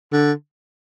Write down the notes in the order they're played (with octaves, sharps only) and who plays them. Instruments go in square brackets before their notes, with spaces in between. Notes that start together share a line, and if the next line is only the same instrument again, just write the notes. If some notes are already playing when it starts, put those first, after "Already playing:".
[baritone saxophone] D3